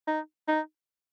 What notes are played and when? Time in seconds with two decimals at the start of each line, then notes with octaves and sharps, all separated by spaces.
0.07 D#4
0.48 D#4